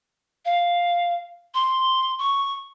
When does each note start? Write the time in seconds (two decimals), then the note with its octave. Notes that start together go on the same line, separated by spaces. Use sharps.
0.45 F5
1.54 C6
2.19 C#6